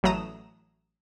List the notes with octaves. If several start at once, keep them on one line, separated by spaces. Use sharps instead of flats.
A1 F#3 A3 A#5 D#6 E7